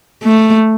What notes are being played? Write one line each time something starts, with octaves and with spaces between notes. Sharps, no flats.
A3